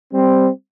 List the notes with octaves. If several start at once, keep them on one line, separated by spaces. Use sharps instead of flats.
G3 C4